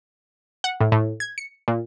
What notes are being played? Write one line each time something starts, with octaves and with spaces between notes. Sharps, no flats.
F#5
A2
A2
G#6
C#7
A#2